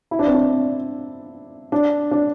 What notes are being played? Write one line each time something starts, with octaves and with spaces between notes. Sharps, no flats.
E4
D4
C4
D4
D4
D4